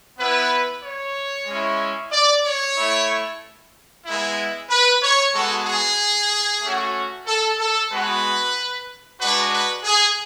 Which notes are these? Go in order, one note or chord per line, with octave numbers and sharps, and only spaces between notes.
B3 E4 B4
C#5
G#3 C#4 E4
D5
C#5
A3 E4
G#3 B3 E4
B4
C#5
G#3 B3 F#4 A4
G#4
A3 C#4 F#4
A4
A4
G#3 B3 F#4 B4
G#3 D4 F#4 B4
B4
G#4